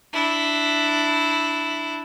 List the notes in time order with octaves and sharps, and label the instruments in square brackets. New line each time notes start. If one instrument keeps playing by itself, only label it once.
[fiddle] D4 E4